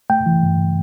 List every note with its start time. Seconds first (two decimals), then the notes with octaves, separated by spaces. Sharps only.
0.10 A3 G5
0.26 E3
0.43 G2